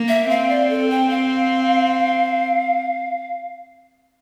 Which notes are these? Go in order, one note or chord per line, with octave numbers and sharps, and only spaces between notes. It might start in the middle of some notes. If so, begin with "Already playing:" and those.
Already playing: A#3
E5
C4 F5
D5
A4
G5
F5